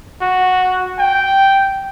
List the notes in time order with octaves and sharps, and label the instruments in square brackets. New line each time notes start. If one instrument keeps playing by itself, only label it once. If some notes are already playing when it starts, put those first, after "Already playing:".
[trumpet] F#4
G5